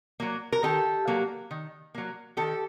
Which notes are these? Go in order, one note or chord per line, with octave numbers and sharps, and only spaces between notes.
F#3 A#3
A#4
D#3 G4 A4
F#3 A#3
D#3
F#3 A#3
D#3 G4 A4